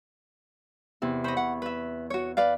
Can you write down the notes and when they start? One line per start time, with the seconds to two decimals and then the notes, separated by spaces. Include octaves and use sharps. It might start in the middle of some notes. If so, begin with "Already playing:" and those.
1.02 E2 C3 E4
1.24 C5 D#5 B5 C#6
1.37 F#5
1.62 B4 E5
2.10 F#4 C#5
2.37 B4 D5 F5